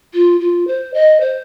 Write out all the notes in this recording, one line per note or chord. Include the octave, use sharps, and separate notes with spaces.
F4
F4
C5
D#5
C5